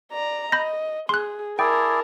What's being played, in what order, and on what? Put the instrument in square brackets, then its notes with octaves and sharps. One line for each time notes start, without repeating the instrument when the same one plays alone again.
[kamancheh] D5 A#5
[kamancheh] D#5 [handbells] B5 G6 A#6
[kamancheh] G#4 [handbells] C6 F#6
[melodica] E4 G#4 D5 [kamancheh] A#4 A5 [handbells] G5